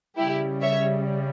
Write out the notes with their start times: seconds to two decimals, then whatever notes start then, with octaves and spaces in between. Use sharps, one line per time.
0.17 C#3 G3 E4 G4
0.62 C#5 E5